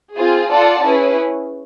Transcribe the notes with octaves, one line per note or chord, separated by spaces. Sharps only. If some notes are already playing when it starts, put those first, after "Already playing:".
C4 F4 G#4
F4 A4 D5 F#5 A5
C#4 E4 G#4 B4